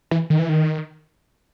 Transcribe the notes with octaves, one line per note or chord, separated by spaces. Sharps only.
E3
D#3
E3
D#3